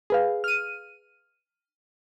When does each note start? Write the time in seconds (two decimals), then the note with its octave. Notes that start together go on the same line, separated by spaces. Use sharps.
0.10 G#4 B4 F5
0.44 F6 D#7